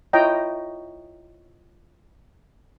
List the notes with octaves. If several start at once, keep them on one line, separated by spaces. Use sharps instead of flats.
E4 F4 C#5 D#5 G5 A#5